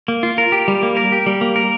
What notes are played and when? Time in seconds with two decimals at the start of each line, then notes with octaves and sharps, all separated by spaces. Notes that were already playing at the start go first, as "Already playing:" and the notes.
0.08 A#3
0.23 F4
0.38 A#4
0.52 G4
0.68 G3
0.83 A#3
0.97 A#4
1.12 G4
1.26 G3
1.41 A#3
1.56 A#4